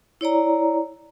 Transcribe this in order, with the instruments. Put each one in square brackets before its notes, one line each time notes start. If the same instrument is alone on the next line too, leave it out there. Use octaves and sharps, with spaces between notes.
[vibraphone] E4 C#5 D5 A#5